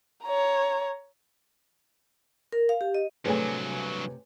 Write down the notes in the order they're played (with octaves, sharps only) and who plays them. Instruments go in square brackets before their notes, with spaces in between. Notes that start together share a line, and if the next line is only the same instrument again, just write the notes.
[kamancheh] C#5 A#5
[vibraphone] A#4
F5
G4
D#5
[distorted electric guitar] G2 F#3 [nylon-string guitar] C3 A3 G#4 [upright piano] B4 C#5 G#5